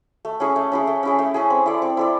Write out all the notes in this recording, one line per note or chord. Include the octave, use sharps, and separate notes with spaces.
A3
C#4 E4 G#4
A3
C#4 E4 G#4
A3
C#4 E4 G#4
A3
C#4 E4 G#4
C4
E4 A4 D5
C4
E4 A4 D5